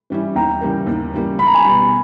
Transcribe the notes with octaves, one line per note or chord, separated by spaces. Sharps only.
E3 G3 C#4 E4
D#2 G5 A#5
C#3 E3 G3 A#3
D#2
C#3 E3 G3 A#3
C#2 B5
A#5
G#5 B5
B2 G3